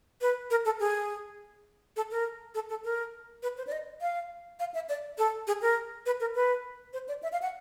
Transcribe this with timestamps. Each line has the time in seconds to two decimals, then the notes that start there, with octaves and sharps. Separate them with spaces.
0.21 B4
0.50 A#4
0.65 A4
0.80 G#4
1.96 A4
2.11 A#4
2.55 A4
2.69 A4
2.84 A#4
3.43 B4
3.57 C5
3.67 D5
3.72 D#5
4.01 F5
4.59 F5
4.74 E5
4.89 D5
5.18 A4
5.47 G#4
5.61 A#4
6.06 B4
6.20 A#4
6.35 B4
6.93 C5
7.08 D5
7.23 E5
7.32 F5
7.42 F#5